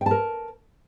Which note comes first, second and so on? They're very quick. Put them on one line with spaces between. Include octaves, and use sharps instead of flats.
G5 A5 A#4